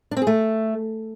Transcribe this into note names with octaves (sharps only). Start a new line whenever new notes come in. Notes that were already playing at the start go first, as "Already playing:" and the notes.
D4
C4
G#4
A3